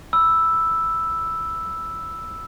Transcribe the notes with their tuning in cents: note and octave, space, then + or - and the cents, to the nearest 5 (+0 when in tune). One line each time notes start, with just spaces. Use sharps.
B5 -5 E6 +0